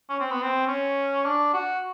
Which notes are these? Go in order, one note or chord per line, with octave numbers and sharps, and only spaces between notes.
C#4
C4
B3
C4
C#4
D4
F#4